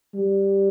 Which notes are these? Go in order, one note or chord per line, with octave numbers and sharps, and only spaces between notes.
G3